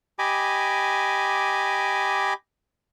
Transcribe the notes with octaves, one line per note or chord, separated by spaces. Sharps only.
G4 D#5 G#5 B5 D6